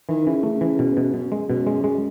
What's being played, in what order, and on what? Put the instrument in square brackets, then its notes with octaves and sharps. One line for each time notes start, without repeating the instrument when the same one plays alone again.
[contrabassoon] D#3 [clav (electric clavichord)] E3
[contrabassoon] C#3 [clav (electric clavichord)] E3
[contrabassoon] C#3 [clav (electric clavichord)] A3
[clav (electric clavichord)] E3
B2
B2
[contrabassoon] F#2 [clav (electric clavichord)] B2
[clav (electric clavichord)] G#3
[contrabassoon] F#2 [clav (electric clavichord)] B2
[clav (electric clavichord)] G#3
G#3